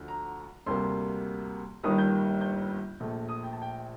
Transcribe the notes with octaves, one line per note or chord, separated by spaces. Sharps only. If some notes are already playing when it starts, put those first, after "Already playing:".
Already playing: D2 D3 F3
A#5
D2 C3 G3 A#3 C6
G1 G2 D#3 G3 A#3 D#6
G6
G6
A#1 A#2 A3
D#6
G5
A5
G5